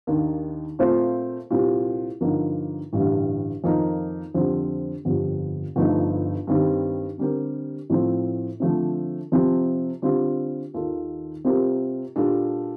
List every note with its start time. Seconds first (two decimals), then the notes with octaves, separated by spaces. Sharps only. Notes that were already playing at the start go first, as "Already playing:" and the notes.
0.07 D#2 D#3 A#3 D4
0.79 A#2 A3 C4 F4 C5
1.51 C2 A#2 G3 C4 G4
2.21 G2 D3 F3 A#3 D#4
2.93 A1 G2 D3 G3
3.64 F2 D#3 A#3 D#4 A#4
4.34 F2 D3 G3 C4
5.05 G1 F2 D3 G3
5.76 G1 G2 F3 A3 D#4
6.47 G2 D#3 G3 C4
7.18 D3 G3 C4 G4 A#4
7.90 A2 F3 C4 F4 A4
8.60 D3 F3 A3 C4
9.32 C3 F3 C4
10.02 D3 G3 C4 F4
10.74 D#2 D#3 A#3 F4 A4
11.45 C3 G3 C4 F4 A#4
12.16 A#2 G3 D4 A4